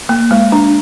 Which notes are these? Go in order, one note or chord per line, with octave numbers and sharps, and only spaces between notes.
A#3
G#3
D4